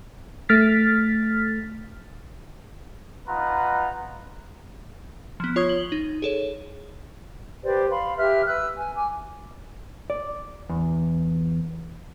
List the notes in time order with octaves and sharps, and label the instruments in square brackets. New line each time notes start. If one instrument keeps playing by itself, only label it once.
[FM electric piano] A3 F6 A6 B6
[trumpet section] D#4 F4 B4 F#5 A#5
[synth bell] F3 B3
F4 C#5 C#6 D#6 G#6
F#7 G7
D#4
G#4 A4 C#5
[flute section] G4 B4 C5 D5
F5 B5 C6
G4 B4 E5 F6
B4 E5 E6 F#6
G#5
G#5 D6
[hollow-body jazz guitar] D5
E2